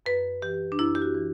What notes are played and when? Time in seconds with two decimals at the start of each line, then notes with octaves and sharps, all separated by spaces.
0.06 F#2 B4
0.42 E3 G4
0.72 D4
0.79 F#2 E4
0.95 G4
1.02 F#4
1.14 E3